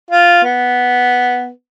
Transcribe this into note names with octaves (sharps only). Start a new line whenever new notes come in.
F4
B3